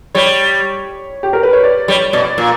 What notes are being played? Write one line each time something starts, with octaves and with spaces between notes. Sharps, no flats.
G3 C#5
G4
A#4
B4
C#5
D5
G3 C#5
B2 D5
A#2